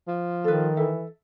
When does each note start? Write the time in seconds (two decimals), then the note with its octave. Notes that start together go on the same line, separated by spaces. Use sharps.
0.08 F3
0.44 D#3 A4 B4
0.77 E3 A4 E5